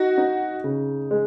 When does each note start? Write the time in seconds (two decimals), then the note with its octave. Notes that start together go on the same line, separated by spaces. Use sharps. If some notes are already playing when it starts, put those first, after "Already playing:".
Already playing: D#4 F#4
0.18 D#4
0.64 C#3
1.11 G#3